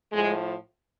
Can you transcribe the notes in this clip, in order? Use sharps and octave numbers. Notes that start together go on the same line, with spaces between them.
A2 F3 G#3